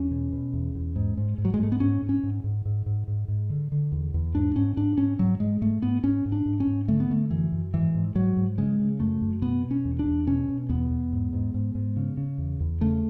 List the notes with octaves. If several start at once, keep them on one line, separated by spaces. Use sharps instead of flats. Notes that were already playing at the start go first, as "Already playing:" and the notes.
Already playing: E2 C#4
B2
B2
E2
E2
G#2
G#2
G#2
F#3
G#3
G#2 A3
B3
G#2 C#4
G#2
C#4
G#2
G#2
G#2
G#2
G#2
G#2
D3
D3
E2
E2
G#2 D4
G#2 C#4
G#2 D4
G#2 C#4
G#2 F#3
G#2 G#3
G#2 A3
G#2 B3
G#2 C#4
G#2
D4
G#2
C#4
G#2
D3 A3
B3
D3 A3
F#2 E3
F#2
G#2 E3
G#2
G#2 F#3
G#2
C#3 G#3
C#3
F#2 A3
F#2
B2 B3
B2
C#4
E2
D4
E2
B2 C#4
B2
E2 B3
E2
G#2
G#2
G#2
G#2
C#3
C#3
E2
E2
C#3 A3